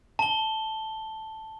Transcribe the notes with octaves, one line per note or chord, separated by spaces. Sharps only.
A5 G7